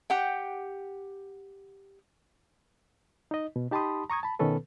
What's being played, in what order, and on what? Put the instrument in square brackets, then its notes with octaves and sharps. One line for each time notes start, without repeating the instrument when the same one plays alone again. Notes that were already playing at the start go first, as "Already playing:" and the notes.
[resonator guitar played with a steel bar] G4 F#5 G5
[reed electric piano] D#4 D#5
B2
D#4 G4 A5 B5 C6 D#6
A#5 C#6 D#6 G#6
A5 B5
B2 D#3 B3 C#4 A4 B4